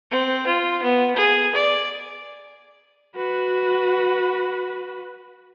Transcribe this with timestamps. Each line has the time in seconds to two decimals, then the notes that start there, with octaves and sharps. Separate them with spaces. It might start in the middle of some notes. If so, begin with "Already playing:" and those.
0.11 C4
0.46 F4
0.82 B3
1.16 G#4
1.54 D5
3.16 F#4 B4